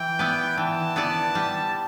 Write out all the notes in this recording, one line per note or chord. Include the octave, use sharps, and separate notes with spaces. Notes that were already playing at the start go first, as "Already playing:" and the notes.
Already playing: E3 G5
B3 E4 B4 D5
E3 A5
B3 E4 B4 D5
G3